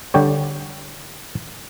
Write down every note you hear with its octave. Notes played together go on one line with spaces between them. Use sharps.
D3 G3 G4 C#5